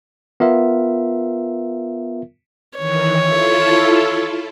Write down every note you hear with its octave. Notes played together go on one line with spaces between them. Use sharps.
B3 F4 A#4 E5
D#3 E3 C#5
E4 F4 A4